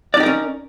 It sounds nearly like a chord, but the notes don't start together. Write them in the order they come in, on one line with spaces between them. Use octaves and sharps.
D5 D#4 G4 A#4 C#4